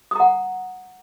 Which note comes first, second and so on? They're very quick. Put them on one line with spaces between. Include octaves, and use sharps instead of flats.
D#6 A#5 F#5